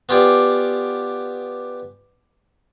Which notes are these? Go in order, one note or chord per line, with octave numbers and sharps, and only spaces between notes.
B3 F4 G4 D5 G#5